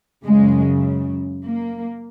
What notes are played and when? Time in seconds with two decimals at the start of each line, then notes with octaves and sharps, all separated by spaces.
0.25 F#2 C#3 G#3
1.47 A#3